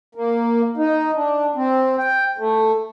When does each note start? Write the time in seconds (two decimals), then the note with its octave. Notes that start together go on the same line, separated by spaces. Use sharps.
0.15 A#3
0.77 D#4
1.16 D4
1.56 C4
1.98 G5
2.38 A3